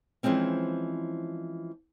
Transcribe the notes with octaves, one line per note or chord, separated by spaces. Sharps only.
E3 F3 G#3 C4 C#4